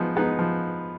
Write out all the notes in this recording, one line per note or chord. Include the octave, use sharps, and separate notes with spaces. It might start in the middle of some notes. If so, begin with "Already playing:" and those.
Already playing: F3 G#3 B3 D#4
G#3 B3 D#4
F3